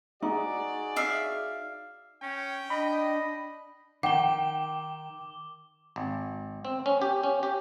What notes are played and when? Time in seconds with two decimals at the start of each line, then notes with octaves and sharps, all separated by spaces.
0.23 D#4 F#4 G#4 D5
0.96 E5 F5
2.22 C#4 G5
2.70 D4 D#5 B5
4.03 D#3 F#5 G5 D6 G7
5.96 G#1
6.65 C4
6.86 C#4
7.02 G4
7.23 C#4
7.43 G4